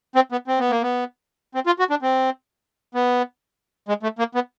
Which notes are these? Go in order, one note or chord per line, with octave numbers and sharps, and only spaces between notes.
C4
B3
C4
B3
A#3
B3
C4
F4
F#4
D4
C4
B3
G#3
A3
A#3
B3